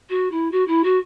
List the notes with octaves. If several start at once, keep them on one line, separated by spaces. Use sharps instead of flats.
F#4
E4
F#4
E4
F#4